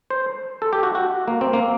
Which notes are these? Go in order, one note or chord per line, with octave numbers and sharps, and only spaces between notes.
C5
A4
G4
F#4
F#4
A#3
C4
A#3